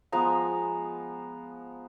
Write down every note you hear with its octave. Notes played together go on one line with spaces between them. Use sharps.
F3 G#3 B3 A#5